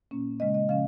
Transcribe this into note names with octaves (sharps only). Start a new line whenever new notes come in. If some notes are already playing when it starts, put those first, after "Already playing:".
A#2 A#3 C#4
C#3 G#3 C#4 D#5
D#5
C#3 F3 C#4 F5